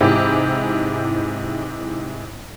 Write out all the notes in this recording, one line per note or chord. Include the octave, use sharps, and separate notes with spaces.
G#2 C3 E3 E4 G4